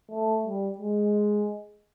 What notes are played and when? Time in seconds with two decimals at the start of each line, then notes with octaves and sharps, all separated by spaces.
0.11 A3
0.45 G3
0.78 G#3